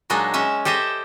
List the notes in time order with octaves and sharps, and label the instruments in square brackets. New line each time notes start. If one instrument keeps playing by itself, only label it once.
[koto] A#2 F#3 G#3 D4 D#4
G#3 C#4 E5
G4 A4 C5 D#5 E5